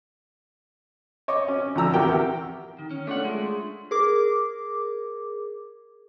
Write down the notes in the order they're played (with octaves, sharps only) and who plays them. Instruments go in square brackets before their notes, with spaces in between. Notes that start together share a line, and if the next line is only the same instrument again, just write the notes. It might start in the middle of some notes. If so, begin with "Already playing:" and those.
[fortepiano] C#5 D#5 C#6 D6
C#4
D2 A2 F3 A#5 E6
E2 C3 F#4 G4 A#4 G5
[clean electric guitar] D#3
C#4
[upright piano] A3 D4 F4 [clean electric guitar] C#5 F#5
[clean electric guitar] G#3
[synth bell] G#4 A#4 D6